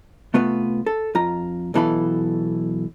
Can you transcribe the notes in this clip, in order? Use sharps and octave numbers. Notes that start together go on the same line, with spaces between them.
C3 A3 B3 F4 B4
A4
F2 F4 A#5
B1 B2 E3 A4 F5 B5